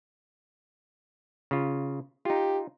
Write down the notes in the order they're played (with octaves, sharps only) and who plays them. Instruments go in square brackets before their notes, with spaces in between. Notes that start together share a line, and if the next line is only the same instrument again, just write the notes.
[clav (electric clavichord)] C#3 F4
[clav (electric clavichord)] D#4 F4 [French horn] G4